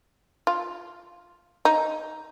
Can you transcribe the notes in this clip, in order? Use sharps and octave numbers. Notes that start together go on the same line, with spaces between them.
F4
D#4